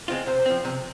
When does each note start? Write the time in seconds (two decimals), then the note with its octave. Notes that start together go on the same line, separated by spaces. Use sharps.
0.08 G#3 C4 F4
0.26 C3 C5
0.46 F3 C4
0.65 C3